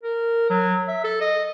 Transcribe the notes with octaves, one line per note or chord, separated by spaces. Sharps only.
A#4
F#3
E5
A4
D#5